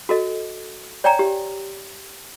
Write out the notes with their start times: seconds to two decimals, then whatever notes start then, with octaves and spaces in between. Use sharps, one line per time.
0.09 F#4 A4 D#5
1.04 C#5 D5 G5 G#5 A#5
1.19 G4